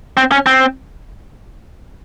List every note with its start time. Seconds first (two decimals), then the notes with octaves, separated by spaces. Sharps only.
0.17 C4
0.32 C#4
0.46 C4